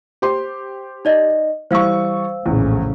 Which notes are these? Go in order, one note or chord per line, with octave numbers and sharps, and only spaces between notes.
G4 C5 C6
D#4 D5 D#5
E3 G3 C5 F5 C#6 E6
A#1 E2 A2 C#3